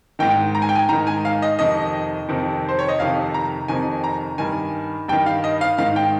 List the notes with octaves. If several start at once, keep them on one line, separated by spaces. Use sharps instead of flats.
G#2 D#3 G5
A#5
G#5
G5
G#5
G#2 D#3 A#5
G#5
F5
D#5
F2 C3 D#3 D#5
F2 C3 D#3
C5
C#5
D#5
F2 C3 D#3 F5
A#5
F2 C3 D#3 G#5
A#5
G2 D#3 G#5
G2 D#3 G5
F5
D#5
F5
G#2 D#3 F5
G5